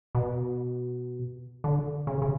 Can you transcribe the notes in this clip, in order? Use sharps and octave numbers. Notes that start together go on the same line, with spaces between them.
B2
D3
C#3
C#3